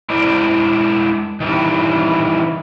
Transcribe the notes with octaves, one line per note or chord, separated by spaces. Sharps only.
G#3 D4 E4 C5 D5
D#3 E3 G3